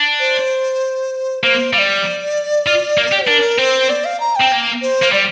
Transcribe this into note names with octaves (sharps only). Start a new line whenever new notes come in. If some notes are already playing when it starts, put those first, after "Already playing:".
Already playing: D4
C5
A#3 C5
G3 F5
D5
F4
A#3
G4
D4 A#4
C4 C5
D5
F5
A#5
C4 G5
A#3
C5
A#3
G3 D5